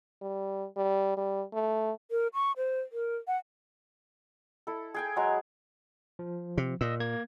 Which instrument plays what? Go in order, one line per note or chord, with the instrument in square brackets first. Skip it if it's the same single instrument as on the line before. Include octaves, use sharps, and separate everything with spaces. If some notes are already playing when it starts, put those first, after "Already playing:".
[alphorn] G3
G3
G3
A3
[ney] A#4
C#6
C5
A#4
F#5
[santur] E4 A4
G#4 G5 G#5
F#3 G#3 A#5
[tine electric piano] F3
[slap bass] C3
[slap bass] A#2 [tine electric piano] D#5 E6
[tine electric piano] A#3 G#6